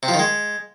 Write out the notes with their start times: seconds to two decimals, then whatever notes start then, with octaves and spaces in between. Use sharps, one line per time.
0.03 C3
0.08 F3
0.14 D#3
0.19 G#3